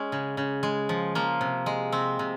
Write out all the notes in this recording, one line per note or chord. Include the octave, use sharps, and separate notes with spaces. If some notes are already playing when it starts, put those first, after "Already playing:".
Already playing: G#3 C#4
C#3
C#3
G#3
F3
F3 A#3
C3
G#3
C3 C4
C3